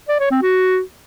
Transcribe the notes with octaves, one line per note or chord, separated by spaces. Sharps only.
D5
C#5
C4
F#4